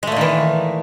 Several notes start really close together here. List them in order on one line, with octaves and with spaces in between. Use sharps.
G#3 A3 A#2 D#3 E3